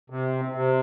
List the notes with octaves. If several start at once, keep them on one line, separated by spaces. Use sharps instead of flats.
C3
C3